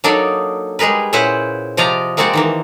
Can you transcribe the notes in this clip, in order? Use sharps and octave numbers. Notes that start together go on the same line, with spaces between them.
F#3 A#3 D4 D#4 A4 D5
G3 G#3 G#4 A#4 B4
A#2 C#4 E4 B4 C5 F#5
C3 F3 D5 D#5 F5 A#5
G#3 A#3 C4 F#4 D5 F#5
D#3 E3 A#3